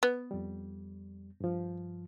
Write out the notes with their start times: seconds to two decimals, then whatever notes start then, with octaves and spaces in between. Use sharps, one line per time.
0.03 B3
0.31 F2 G3
1.40 G2 F3